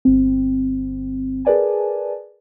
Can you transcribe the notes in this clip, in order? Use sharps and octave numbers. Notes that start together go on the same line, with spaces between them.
G1 C4
G#4 A#4 B4 D5 G#5 A5